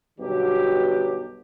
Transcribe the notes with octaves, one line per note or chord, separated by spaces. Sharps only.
B1 G2 B2 D3 F#3 G4